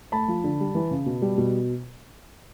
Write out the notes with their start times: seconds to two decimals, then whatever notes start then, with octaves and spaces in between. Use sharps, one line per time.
0.12 A3 A5 B5
0.28 F3
0.44 D3
0.60 G3
0.75 E3
0.91 C#3
1.06 B2
1.22 G3
1.38 B2